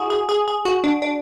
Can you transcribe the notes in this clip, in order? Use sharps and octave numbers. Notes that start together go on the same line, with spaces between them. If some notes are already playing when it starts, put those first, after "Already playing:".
Already playing: E4 F#4 G#4
G#4
G#4
G#4
F#4
D4
D4